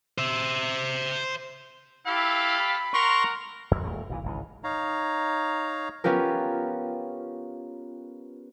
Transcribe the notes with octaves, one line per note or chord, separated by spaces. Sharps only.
C5 E5
E4 G4 A4 F5
B5
A#4 F#5 A#5 C6 C#6
A1 F2
D#1 E2 A3
B1 A#2 E3
G#1 C#2 E3
D#4 C#5 F5 A#5
B3 C#4 F4 G4 A#4